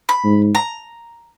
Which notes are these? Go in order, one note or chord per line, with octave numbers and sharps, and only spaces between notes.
B5
G#2
A#5